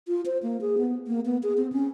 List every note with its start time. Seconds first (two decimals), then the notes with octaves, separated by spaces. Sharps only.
0.08 F4
0.26 C5
0.43 A#3
0.61 G#4
0.78 B3
1.07 A#3
1.25 B3
1.43 G#4
1.57 C4
1.72 C#4